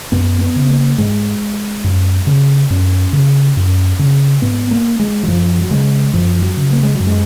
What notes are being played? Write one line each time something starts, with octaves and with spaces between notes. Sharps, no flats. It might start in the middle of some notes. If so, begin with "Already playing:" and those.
F#2 B3
B3
C#3
A#3
G#2 G#3
F#2
C#3
F#2 C#4
C#3
F#2
C#3
G#2 B3
A#3
G#3
F#3
F#2 F3
F#3
C#3 G#3
F#2 F3
F#3
C#3
A#3
G#3
F#3
F#2
G#3